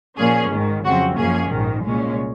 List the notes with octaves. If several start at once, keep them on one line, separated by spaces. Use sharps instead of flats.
A#2 F3 A#3 C#4 G#4
G#1 G#2 D#3
F2 C#3 F#3 C4 F#4
F#2 F3 A#3 C#4 G#4
A#1 G#2 D#3
C2 A#2 G#3 C#4